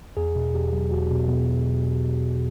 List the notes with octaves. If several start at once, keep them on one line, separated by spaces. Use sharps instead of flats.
E2 G#4
B2
E2 G4
F#3
E2 F#4
B2
B2